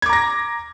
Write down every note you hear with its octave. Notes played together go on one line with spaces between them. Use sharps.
A#5 D6 G#6 A#6